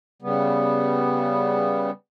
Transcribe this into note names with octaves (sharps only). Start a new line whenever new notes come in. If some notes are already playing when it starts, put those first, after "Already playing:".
C#3 G3 B3